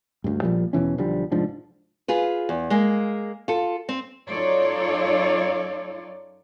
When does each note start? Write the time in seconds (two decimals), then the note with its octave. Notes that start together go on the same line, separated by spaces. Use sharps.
0.24 D2 G2
0.42 A#1 A#2 F3 G3
0.73 E2 B2 E3 C#4
0.98 B1 D3 F3 G3
1.32 F1 G#2 F3 D4
2.08 F4 G#4 B4
2.49 E2
2.70 G#3 A#3
3.48 F4 A4
3.89 C4
4.27 F#2 D#4 F4 A4 C#5 D5